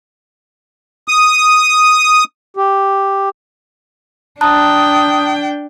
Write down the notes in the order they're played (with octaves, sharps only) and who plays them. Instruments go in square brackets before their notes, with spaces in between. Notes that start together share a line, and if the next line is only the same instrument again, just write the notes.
[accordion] D#6
[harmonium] G4
[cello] D4 G5 [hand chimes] A5 A#5 F#6 [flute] D#6